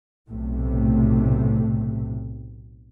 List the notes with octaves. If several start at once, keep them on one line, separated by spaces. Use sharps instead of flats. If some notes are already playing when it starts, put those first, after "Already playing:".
B1 A2 C3 A3